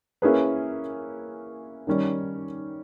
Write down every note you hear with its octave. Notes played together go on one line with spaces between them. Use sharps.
A#3 C#4 E4 G#4 B4
D#3 G3 C#4